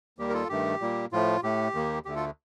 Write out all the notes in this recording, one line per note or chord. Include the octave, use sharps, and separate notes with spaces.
D#2 D#3 G3 A#3 G4
A#4
F4 A4
G2 D#3 A3 G4
A#2 G3 A#3
A2 F3 A3 F4
A2 A3 G4
D#2 D#3 A#3
D2 D3 A3 G4
F4 A4